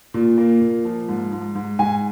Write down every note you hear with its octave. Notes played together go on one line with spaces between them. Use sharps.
A#2
A#3
A#2
F3
G#2
G#2
G#2
G#2 G#5